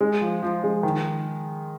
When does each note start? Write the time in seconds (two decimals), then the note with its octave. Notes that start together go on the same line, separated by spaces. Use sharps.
0.01 G#3
0.22 F3
0.43 F3
0.64 G#3
0.83 D#3